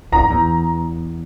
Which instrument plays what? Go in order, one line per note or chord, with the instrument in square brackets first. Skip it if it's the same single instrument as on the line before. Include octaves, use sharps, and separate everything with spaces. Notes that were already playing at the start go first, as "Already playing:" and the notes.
[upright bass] F2 [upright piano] A#5
[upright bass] E2